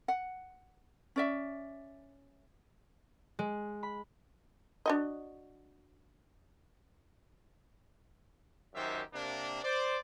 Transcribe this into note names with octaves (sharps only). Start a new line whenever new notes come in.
F#5
C#4 D5 E5
G#3
B5
D4 F#4 D#5
F#2 D#3 D#4 G4 C5 E5
C3 A#3 D4
C5 D5